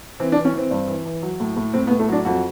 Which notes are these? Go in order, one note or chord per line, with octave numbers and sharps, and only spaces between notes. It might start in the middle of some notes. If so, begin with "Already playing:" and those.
E3 C4
D4
E3
C#4
E3 C4
G2
E3
E3
F#3
A2
A2
A2 C4
B3
A2
A3
F#3 D4
F2 F#4